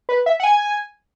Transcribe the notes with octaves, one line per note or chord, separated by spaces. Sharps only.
B4
E5
F#5
G#5